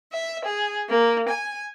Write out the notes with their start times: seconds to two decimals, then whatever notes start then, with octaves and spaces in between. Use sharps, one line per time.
0.12 E5
0.45 G#4
0.89 A#3
1.27 G#5